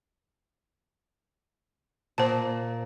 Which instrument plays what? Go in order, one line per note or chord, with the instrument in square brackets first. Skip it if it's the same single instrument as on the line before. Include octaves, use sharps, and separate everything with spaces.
[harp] A#2 [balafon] C5 A5